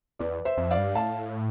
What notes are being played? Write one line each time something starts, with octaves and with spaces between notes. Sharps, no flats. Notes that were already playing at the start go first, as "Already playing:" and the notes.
E2 B4 D5
C5 E5
F2
D5 F5
G2
A2 F5 A5